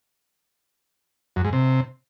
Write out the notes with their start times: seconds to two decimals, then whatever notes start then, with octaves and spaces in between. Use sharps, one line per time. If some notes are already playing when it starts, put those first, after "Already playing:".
1.36 F#2
1.45 G#2
1.53 C3